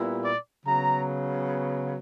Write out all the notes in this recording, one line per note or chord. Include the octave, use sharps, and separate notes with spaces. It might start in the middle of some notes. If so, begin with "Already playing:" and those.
Already playing: A#2 G3 B3 E4
D5
C#3 F#3 B3 A#5